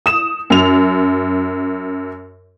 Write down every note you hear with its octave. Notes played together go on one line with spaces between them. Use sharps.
D#6 E7
F#2 F7